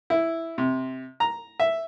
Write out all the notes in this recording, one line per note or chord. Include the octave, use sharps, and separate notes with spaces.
E4
C3
A#5
E5